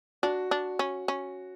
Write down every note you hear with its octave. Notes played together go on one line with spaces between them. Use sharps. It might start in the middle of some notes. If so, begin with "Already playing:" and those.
D4 F#4
D4
C#4
C#4